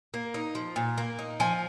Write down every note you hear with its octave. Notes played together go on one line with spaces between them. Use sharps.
A#3
D#4
F3
A#2
A#3
D#4
F3 G#5